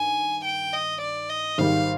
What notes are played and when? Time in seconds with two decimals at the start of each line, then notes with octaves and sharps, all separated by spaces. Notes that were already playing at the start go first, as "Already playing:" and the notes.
Already playing: G2 D#3 G#5
0.45 G5
0.73 D#5
1.01 D5
1.29 D#5
1.58 G#1 G#2 D#3 G3 F5